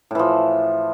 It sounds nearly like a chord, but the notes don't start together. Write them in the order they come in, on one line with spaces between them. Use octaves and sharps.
A2 E3 F3